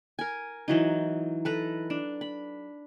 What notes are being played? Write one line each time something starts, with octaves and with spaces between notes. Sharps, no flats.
A#4 G#5
E3 F#3 D#4
A4 B4 A#5
D4
B5